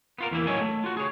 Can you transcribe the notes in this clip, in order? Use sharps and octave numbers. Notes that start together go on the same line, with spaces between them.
B3 F4 A#4
E2 E3 A#3 E4
A2 F#3 C#5 D#5 G#5
A3
F4 F#4
G#4 C#5